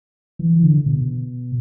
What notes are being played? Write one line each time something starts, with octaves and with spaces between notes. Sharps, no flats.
E3
D3
B2